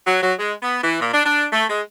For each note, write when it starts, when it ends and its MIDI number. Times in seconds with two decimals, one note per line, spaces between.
0.07 0.18 54
0.22 0.33 54
0.39 0.53 56
0.63 0.79 59
0.83 0.99 52
1.01 1.10 46
1.13 1.25 62
1.25 1.45 62
1.52 1.64 57
1.70 1.81 56